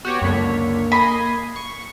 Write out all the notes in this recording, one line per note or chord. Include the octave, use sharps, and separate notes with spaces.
B3 F#4 G4 C#5
C#2 F#2 D3 A#3 C#5 B6
D#5 G#5 B5 C7
C#6